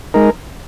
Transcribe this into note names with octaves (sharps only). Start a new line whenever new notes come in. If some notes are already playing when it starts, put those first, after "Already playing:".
G#3 D#4 A#4